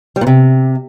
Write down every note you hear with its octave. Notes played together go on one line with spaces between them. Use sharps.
G3
A#2
C3